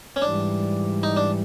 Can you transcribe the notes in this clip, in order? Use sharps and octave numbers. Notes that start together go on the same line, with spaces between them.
C#4
G#2 E3 G3 D4
D#4
D4